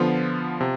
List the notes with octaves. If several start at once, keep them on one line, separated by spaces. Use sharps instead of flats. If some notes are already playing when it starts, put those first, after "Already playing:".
Already playing: D3 F3 B3 F4
C3